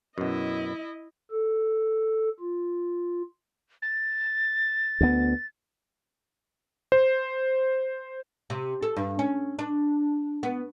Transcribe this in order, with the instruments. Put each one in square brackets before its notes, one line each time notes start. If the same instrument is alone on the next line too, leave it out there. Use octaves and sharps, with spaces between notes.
[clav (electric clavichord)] F#2 B2 [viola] E4 D#5
[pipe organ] A4
F4
[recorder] A6
[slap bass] D2 B3
[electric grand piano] C5
[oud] C3
A4
G2
C#4
D4
B3